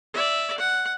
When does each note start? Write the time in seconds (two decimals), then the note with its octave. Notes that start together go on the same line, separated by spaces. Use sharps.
0.14 D5 E5
0.58 F#5